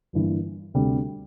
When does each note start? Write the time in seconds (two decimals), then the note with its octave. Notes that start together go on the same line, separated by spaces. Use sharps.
0.13 G1 G2 E3 A#3
0.74 D2 C3 G3